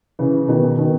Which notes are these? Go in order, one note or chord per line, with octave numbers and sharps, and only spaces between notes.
C#3 E3
B2 D#3
B2 D#3